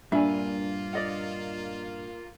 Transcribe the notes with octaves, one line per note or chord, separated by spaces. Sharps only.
G2 A#2 A#3 D4 F4 E5 G#5
D5 D#5 F#5